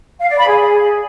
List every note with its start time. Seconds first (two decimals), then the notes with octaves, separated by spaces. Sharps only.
0.19 F5
0.28 D5
0.38 B5
0.47 G#4